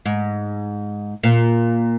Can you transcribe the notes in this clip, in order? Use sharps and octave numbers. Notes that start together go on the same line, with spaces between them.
G#2
A#2